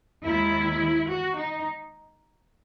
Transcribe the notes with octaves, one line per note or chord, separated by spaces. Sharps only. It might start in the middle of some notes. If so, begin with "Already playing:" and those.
D#2 D#3 G#3 E4
F#4
D#4